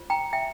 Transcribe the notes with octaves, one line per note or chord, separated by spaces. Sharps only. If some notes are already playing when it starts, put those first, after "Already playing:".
Already playing: F4 C5
G5 A#5
E5 G5